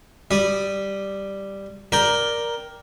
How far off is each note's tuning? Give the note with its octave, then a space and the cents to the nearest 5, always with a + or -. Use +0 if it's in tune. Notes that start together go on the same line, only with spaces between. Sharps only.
G3 +0 D5 +0 D#6 -15
A#4 +10 D5 +0 G5 +0